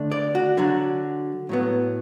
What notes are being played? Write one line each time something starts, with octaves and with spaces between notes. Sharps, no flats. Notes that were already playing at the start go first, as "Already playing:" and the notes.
Already playing: D3 A3 D4
D5
F#4
D3 F#3 D4 F#4
A2 F#3 B3